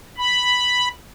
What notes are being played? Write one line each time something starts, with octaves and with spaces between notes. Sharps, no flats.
B5